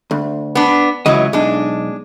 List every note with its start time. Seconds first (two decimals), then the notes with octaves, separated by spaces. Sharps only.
0.11 D2
0.55 B3 D4
1.06 C#2 C#3 E3 F#3 D#5
1.33 B1 G#3 D4